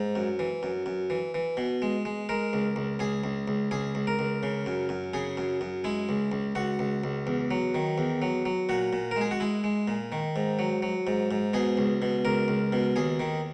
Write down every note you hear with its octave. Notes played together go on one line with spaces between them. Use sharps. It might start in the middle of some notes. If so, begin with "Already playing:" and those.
Already playing: G#2
F#2
E3
F#2
F#2
E3
E3
B2
G#3
G#3
G#3 A#4
C#2
C#2
C#2 G#4
C#2
C#2
C#2 G#4
C#2
A#4
C#2
C#3
F#2
F#2
C#3 G#4
F#2
F#2
G#3 E4
C#2
C#2
C#2 F#4
C#2
C#2
E2
F#3
D#3
E2
F#3
F#3
A#2 F#4
A#2
A#4
G#3 G#4
F#4
G#3 E4
G#3
A#2
D#3
G#2
F#3
F#3
G#2
G#2
B2 G#4
C#2
B2
C#2 A#4
C#2
B2
D#2 G#4
D#3